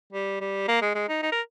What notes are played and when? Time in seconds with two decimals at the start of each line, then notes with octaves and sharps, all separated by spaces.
0.13 G3
0.40 G3
0.68 A#3
0.81 G#3
0.95 G#3
1.09 D#4
1.22 D#4
1.32 A#4